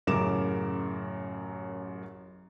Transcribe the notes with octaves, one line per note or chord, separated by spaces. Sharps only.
A1 F#2 C#3 A#4 D6 E7